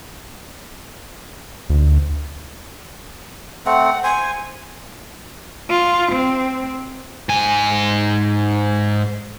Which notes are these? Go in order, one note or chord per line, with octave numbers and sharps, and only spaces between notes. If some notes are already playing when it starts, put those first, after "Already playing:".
D2
A3 C4 F#5
C5 G#5
F4
C4
G#2 G#5